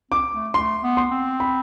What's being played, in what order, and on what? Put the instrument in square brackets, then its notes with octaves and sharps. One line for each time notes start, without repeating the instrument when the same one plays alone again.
[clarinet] C4 [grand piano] D6
[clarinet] A3
[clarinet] A3 [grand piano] C6
[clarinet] B3
[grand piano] C6
[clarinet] C4
[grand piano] B5